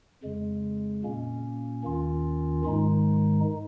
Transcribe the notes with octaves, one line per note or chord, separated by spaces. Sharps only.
F2 C#3 G#3
A#2 A#3 C#4
D#2 D#3 C#4 F4
G#2 D#3 G#3 D#4